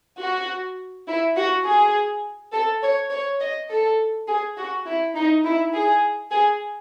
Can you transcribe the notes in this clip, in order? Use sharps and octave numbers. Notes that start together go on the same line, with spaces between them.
F#4
E4
F#4
G#4
A4
C#5
C#5
D#5
A4
G#4
F#4
E4
D#4
E4
G#4
G#4